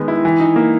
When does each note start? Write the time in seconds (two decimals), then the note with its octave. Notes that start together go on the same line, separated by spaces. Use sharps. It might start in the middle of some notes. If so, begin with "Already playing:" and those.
Already playing: D#3 G#3 B3
0.08 E4
0.25 E3
0.40 D#4
0.56 A#3